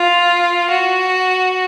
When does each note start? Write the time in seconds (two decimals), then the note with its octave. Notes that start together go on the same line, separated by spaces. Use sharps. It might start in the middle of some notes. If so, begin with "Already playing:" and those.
Already playing: F4
0.70 F#4